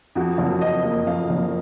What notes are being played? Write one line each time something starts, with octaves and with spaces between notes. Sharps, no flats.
F2 F#4
F#1
F3 D#5
A#3
F2 F5
F#1